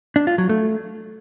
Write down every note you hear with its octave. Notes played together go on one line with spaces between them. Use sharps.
D4
F4
F#3
A3